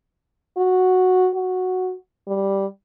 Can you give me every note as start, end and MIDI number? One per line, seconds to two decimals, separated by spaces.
0.57 1.30 66
1.35 1.94 66
2.28 2.66 55